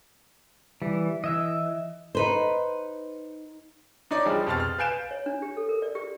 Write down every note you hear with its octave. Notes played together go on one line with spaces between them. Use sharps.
E3 G3
E3 D#5 E5 E6
D#4 B4 C5
D4 D#4 C#5 D5
F3 G3 G#3 G4
F2 B2 C6 F6 A6
F6
B4 F5 G#5 G6 D7 E7
C#5
D4
G4
A4
A#4
D5
G4